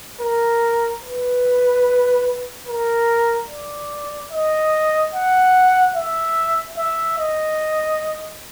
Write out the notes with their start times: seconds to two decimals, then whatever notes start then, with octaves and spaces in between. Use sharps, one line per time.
0.21 A#4
1.03 B4
2.67 A#4
3.50 D5
4.32 D#5
5.14 F#5
5.96 E5
6.78 E5
7.19 D#5